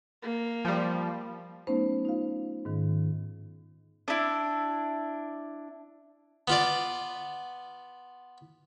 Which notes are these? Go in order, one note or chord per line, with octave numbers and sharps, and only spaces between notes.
A#3
F3 G3
F#3 A3 B3 C#4 D#4 C5
D#4 F4 F5
G#2 D#3
D4 E4
B3 F4 D5